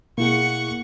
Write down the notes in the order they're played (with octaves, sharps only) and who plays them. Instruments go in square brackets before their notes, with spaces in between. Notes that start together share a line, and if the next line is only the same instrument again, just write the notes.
[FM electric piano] B2 E4 G#4 [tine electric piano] A#3 [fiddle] F#5 C#6